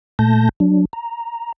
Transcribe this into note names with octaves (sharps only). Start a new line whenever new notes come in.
A#2 A3 A5 G6 A#6
F#3 D4
A#5